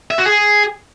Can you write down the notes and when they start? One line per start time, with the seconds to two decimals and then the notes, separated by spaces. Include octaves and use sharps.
0.11 E5
0.18 F#4
0.26 G#4